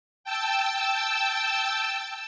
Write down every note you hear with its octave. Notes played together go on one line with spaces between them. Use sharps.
G5 A5 E6